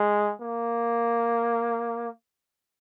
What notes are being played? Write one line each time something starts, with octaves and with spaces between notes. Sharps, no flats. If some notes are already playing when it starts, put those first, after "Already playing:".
Already playing: G#3
A#3